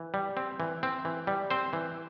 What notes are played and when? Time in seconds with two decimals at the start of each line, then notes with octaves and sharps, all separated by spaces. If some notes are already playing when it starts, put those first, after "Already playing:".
Already playing: E3
0.14 G3
0.37 C4
0.60 E3
0.83 C4
1.05 E3
1.27 G3
1.50 C4 C5
1.73 E3